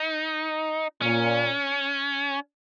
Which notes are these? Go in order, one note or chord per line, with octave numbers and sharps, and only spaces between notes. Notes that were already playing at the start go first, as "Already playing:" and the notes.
Already playing: D#4
A#2 C#4